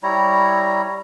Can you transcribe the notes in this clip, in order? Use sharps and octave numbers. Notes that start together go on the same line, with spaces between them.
G3 E4 C#5 A#5